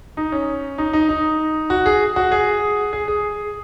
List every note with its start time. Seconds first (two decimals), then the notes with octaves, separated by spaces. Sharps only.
0.17 D#4
0.32 C#4
0.78 D#4
0.93 D#4
1.09 D#4
1.70 F#4
1.86 G#4
2.16 F#4
2.32 G#4
2.93 G#4
3.08 G#4